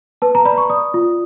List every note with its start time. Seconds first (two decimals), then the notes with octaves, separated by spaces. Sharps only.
0.22 B4 A5
0.35 A#5
0.45 D5 B5
0.58 C#6
0.70 D5 D#6
0.94 F4